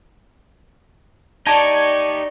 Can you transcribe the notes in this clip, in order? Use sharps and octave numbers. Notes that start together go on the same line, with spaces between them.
D#4 G4 D5 A5 C#6 G#6